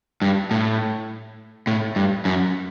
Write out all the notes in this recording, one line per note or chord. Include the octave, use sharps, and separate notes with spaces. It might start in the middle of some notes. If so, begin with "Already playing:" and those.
G2
A2
A2
G2
F#2